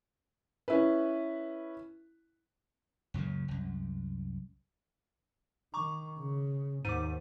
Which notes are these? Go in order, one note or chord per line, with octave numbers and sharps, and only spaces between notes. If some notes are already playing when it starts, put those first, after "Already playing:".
C#4 E4 B4
C#2 F#2 A#2 C#3
C2 F#2
D#3 A#5 C#6 D6
C#3
D#2 G#2 D6 D#7